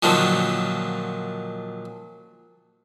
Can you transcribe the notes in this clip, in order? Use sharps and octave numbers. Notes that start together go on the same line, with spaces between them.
A#2 D3 D#3 F3 F#3